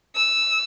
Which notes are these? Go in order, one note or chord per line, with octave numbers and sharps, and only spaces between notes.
E6